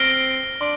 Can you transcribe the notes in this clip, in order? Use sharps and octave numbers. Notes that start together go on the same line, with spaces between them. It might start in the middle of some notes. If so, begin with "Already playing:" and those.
Already playing: C4 F6 A#6 D7 G7
D4 C6